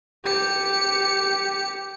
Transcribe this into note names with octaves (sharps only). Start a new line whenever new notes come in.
G4 C#7